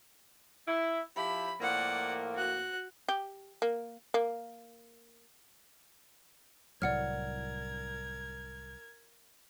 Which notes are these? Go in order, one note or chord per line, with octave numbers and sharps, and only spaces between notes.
E4
F3 E4 G4 B5
A2 F3 A#3 D5 F#5
F#4 F#6
G4
A#3
A#3
C2 A2 F#3 A#4 D5 F#5 F6 G#6